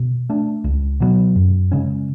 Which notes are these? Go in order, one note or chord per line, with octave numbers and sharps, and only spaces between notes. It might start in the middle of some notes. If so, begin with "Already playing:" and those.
Already playing: B2
A3 D4
C#2
B2 F#3 B3
F#2
C#3 G#3 C#4